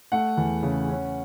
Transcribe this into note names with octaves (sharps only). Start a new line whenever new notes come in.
A3 F#5
E2
C#3
C#4